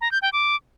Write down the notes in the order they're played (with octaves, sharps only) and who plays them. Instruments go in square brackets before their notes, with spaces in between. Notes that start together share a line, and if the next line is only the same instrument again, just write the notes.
[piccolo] A#5
G6
G5
D6